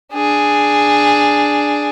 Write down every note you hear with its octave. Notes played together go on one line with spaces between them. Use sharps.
D4 G#4